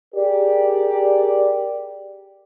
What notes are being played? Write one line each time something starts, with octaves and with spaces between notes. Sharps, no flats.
G4 G#4 A#4 D5